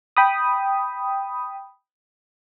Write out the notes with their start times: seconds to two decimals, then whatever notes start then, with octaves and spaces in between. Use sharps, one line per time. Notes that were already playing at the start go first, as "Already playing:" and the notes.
0.17 G5 B5 D#6